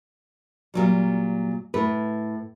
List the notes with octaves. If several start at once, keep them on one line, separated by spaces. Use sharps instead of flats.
A#2 F#3 G3
A2 B4